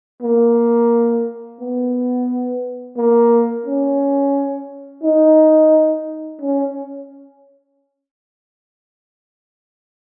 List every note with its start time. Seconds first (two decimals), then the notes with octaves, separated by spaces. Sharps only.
0.22 A#3
1.60 B3
2.97 A#3
3.66 C#4
5.03 D#4
6.41 C#4